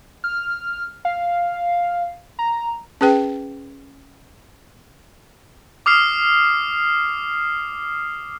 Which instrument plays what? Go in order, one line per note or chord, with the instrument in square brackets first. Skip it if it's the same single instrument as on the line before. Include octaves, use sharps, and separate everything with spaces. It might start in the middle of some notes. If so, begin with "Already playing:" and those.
[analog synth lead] F6
F5
A#5
[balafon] C#4 G#4 B4 G5
[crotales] D6 D#6 F6 C7